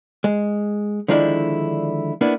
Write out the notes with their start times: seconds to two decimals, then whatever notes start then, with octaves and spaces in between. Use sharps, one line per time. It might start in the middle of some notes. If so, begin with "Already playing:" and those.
0.24 G#3
1.08 D3 D#3 F3 G#3 D4 E4
2.21 A#3 B3 D4 E4